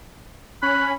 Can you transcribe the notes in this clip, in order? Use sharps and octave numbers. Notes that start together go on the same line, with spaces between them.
C#4 B5 F#6